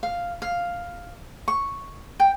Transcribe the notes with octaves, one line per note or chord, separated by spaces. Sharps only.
F5
F5
C#6
G5